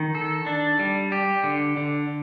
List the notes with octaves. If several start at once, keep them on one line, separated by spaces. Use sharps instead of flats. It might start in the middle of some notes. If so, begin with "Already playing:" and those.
Already playing: D#3
A4
D4
G3
G4
D3
D3